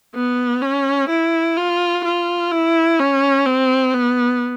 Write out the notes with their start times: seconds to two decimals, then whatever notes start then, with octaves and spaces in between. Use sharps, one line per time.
0.15 B3
0.62 C#4
1.10 E4
1.57 F4
2.04 F4
2.51 E4
2.99 C#4
3.46 C4
3.94 B3